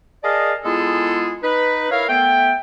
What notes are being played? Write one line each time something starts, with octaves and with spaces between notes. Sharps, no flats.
G#4 A#4 D5 D#5 F5 A5
G#3 B3 E4 F4 G#4 A4
D#4 B4
E4 A#4 C#5 F5
A3 B3 E5 G5